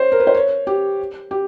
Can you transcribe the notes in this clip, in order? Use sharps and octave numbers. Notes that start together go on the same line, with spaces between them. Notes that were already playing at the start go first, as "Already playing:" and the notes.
Already playing: C5 C#5
A#4
B4
C5
C#5
G4
G4